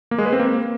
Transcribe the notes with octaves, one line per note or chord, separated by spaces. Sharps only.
A#3
G#3
B4
C4
A#3